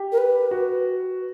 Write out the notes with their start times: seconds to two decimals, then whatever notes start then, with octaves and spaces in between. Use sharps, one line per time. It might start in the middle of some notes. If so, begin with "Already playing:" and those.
Already playing: G4
0.12 A#4
0.18 B4
0.51 F#4